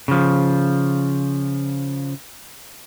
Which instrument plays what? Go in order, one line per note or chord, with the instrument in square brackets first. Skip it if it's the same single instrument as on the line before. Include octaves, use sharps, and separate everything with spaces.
[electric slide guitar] C#3 F3